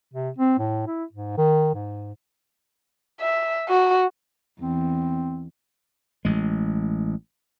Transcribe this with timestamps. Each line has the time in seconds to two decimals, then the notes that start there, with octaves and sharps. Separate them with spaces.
0.13 C3
0.38 C4
0.59 A2
0.87 E4
1.13 G#2
1.37 D#3
1.74 G#2
3.21 E5
3.68 F#4
4.60 E2 C4
6.25 A1 G#3